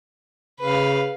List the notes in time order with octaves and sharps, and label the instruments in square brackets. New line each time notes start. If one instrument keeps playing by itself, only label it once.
[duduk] C#3 [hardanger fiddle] B4 F5